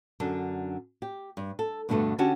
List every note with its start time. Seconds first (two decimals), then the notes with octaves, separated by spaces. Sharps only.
0.20 F#2 D3 D4
1.02 G4
1.37 G2
1.59 A4
1.89 G2 B2 D3 A3 B3
2.18 D3 C#4 D4 F#4 G4 A5